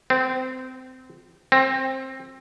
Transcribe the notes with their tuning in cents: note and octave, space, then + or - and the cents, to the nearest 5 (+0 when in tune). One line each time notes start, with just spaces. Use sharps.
C4 -25
C4 +15